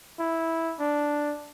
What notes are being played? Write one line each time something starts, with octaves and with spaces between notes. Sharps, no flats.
E4
D4